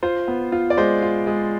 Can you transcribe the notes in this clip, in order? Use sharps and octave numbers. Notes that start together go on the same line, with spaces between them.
F4 C5
B3
F4
D5
G#3 C5
F4
G#3